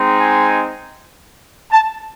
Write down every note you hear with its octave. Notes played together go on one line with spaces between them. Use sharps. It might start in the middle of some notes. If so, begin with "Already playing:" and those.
Already playing: G#3 C4 D#4
G#5
A5